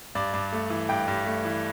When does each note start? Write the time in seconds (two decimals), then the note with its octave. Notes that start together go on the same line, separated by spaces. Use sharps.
0.15 G2 D5
0.34 G2
0.53 A3
0.70 E3
0.89 G2 G5
1.08 G2
1.26 A3
1.45 E3